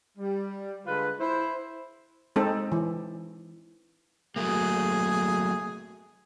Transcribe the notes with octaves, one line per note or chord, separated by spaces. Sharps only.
G3
D3 G#3 F4 B4
E4 C5
G#3 C4 D#4 A4
E3
F#3 A3 A#3 G#4